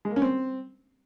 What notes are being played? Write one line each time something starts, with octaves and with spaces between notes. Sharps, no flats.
G#3
A#3
C#4
C4